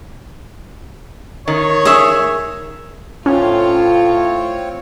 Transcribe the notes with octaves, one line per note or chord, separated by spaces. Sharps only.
D#3 C#5
G#4 E5
A2 C4 C#4 F4 C#5